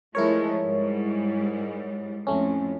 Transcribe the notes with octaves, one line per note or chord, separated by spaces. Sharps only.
F3 G#3 A3 E4 A#4 C#5
G#2 G3
F2 A2 A3 C#4